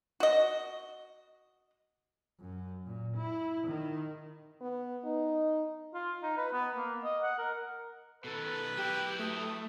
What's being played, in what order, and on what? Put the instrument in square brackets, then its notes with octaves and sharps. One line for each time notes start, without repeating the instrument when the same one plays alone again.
[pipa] F#4 D#5
[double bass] F#2
A#2
E4
D#3
[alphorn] B3
D#4
[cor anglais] F4
D#4
B4
B3
A#3
D#5
F#5
A#4
[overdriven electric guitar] B2 D#3 [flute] A4 [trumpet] B4
[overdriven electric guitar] F#3 E4 [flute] G4
[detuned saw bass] A3 [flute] D#6